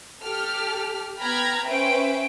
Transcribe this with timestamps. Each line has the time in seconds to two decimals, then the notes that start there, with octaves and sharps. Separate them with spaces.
0.22 G4 A4 F6
1.21 B3 G5 A#5 B5 F6 G#6
1.67 C#4 B4 C5 E5 G5 D7